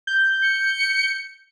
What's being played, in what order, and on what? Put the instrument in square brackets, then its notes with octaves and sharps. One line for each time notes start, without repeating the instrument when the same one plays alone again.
[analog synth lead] G6
[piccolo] C#7